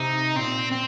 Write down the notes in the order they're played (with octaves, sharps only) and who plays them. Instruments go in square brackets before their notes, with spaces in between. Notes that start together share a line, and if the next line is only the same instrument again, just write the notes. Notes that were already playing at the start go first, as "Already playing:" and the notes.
Already playing: [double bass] C3 [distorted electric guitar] D#4
[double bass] A#2 [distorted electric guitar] C4
[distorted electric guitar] C4